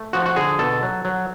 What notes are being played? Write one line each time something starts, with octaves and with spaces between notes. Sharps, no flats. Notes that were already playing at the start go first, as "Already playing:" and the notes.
Already playing: A3
F3 F#4
F#4
D3 G#4
B2 A4
F#3
F#3